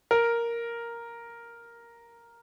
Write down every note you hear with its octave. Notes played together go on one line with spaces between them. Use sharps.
A#4